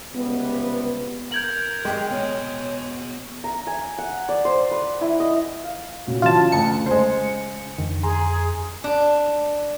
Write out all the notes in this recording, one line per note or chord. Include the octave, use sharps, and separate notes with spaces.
C#2 C3 G3 B3
A#4 A#5 G6 G#6 F#7
G#3 G5
B3 C#5 D#5
A#5
G#5
F#5
D5
C5
B4
E4
D#5
F5
A#2 C#4 F#4
C#3 E3 F#3 F4 A5
D2 C#3 A5 C#7
G#3 C5
F2 D3 D#3
G#4 G#5 A#5 C6
D4